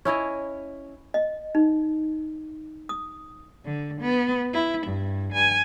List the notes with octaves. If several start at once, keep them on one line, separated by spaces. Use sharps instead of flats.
C#4 E4 C#5 D#5
D#5
D#4
D#6
D3
B3
E4
G2
G#5